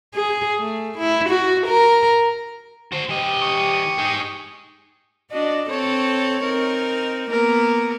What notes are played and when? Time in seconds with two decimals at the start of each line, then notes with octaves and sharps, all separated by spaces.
0.14 G#4
0.59 A3
0.98 E4
1.30 F#4
1.67 A#4
2.92 F#4 C5
3.09 E3 G4 D#5
3.42 C#6 D#6
3.98 D#4 G#4
5.31 D4 F#4 D#5
5.69 C4 A4 C#5
6.42 C4 D#4 A#4
7.30 A#3 B3 A#4